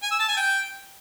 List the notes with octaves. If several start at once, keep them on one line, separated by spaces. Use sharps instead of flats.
G#5
E6
A5
G#5
G5